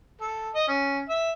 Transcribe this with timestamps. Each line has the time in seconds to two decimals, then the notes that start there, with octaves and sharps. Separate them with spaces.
0.20 A4
0.55 D#5
0.68 C#4
1.09 E5